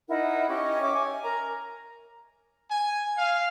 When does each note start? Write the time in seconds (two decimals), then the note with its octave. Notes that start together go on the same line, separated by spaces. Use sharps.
0.09 D#4 E4 A#4 F#5
0.48 C#4 G4 C#5 D#5
0.81 C#5 E5 D6
0.95 G#5
1.24 A#4 A#5
2.69 G#5
3.17 F5